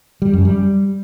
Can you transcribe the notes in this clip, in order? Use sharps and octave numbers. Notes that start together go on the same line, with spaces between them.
G3
F#2
G3